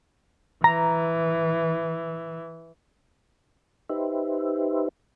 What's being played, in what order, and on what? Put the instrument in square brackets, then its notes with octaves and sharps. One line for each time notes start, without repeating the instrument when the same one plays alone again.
[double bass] E3 [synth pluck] A#5
[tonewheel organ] D#4 G4 B4 C5 E5